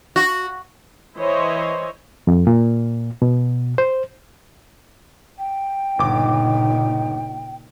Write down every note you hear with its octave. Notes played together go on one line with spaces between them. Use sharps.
F#4
E3 E4 C5 C#5 D#5
F2
A#2
B2
C5
G5
G1 A#2 C#3 D#4 D6